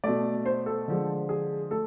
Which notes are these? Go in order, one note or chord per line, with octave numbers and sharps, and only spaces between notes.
B2 A3 D5
C5
A4
D3 F3 G#3
G#4
A3 A4